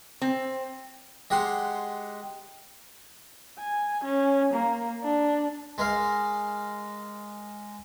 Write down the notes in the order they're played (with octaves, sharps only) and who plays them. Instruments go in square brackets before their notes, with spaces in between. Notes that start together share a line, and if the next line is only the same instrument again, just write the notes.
[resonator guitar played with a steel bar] C4
[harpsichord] G#3 G4 F#5 C6
[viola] G#5
C#4
A#3
D4
[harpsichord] G#3 A#4 F5